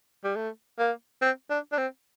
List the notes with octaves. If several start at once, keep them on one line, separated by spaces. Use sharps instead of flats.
G3
A3
A#3
C4
D4
D4
C4